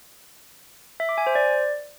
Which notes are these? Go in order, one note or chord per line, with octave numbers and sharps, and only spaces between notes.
E5
D6
G#5
C5
D5